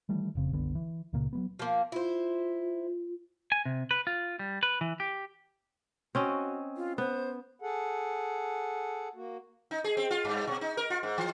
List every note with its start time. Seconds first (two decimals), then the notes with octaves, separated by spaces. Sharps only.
0.09 D#3 E3 G3 A3
0.35 F1 C#3 C4
0.51 F#1 C2 D3 B3
0.75 E3
1.13 C#2 A#2 C#3 A#3
1.33 F#3 G3 B3
1.59 F3 A#3
1.92 E4 F4 C5
3.52 G#5
3.65 C3
3.91 B4
4.07 F4
4.39 G3
4.63 B4
4.81 E3
5.00 G4
6.15 C4 C#4 F#4 D#5
6.77 F4
6.98 B3 C5
7.62 G#4 A4 F#5
9.15 A#3 F#4
9.71 D#4
9.84 G#4
9.97 C4
10.11 F4
10.25 G2
10.47 B2
10.61 D#4
10.77 A#4
10.90 F4
11.03 G#2
11.18 E3